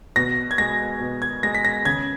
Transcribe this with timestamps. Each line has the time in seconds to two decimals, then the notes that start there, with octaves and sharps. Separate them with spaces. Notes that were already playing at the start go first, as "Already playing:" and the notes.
0.16 B2 A#6
0.51 G#6
0.58 G#3 A#6
1.01 B2
1.22 G#6
1.43 G#3 A#6
1.54 B6
1.65 A#6
1.85 C#3 G#6